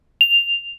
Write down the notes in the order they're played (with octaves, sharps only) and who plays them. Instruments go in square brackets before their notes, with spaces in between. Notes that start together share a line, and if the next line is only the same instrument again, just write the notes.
[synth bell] F7